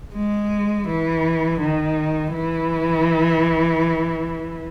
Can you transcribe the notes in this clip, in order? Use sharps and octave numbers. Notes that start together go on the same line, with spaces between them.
G#3
E3
D#3
E3